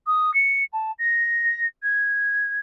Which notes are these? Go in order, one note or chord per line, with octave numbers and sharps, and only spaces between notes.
D#6
C#7
A5
A#6
G#6